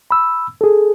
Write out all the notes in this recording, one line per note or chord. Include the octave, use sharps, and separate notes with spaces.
B5 E6
G#4 A4